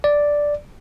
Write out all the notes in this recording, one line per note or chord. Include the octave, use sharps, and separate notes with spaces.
D5